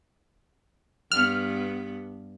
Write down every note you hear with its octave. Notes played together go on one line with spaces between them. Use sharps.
G2 B3 F6